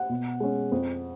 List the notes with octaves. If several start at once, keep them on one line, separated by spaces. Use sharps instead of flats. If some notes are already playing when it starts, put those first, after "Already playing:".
Already playing: F#5
B2
G#3 C#4
F2